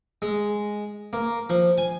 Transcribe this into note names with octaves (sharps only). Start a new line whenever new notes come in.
G#3
A#3
F3
G#5